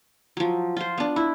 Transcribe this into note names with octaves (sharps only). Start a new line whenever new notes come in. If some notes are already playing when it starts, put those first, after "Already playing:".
F3 F#3
F4 C5
B3 D4
E4